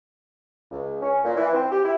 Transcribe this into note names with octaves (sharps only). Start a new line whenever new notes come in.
C#2
C#4
A#2
E3
C4
G4
E4